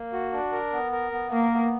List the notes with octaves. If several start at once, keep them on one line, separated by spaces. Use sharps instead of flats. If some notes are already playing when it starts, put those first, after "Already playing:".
Already playing: A#3
F#4
D4
A#4
B3
A#4
B3
A#3 A#4
B3